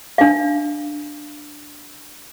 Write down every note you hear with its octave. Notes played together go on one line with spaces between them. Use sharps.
D4 F5